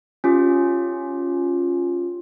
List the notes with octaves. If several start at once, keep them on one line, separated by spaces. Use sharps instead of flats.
C#4 F4 G4